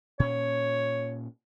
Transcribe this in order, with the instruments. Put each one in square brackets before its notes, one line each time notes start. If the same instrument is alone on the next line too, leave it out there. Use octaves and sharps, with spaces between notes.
[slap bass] A#2 C#4 [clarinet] C#5